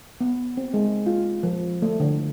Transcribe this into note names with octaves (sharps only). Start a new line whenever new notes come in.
B3
C4
G#3
F4
F3
A3
D3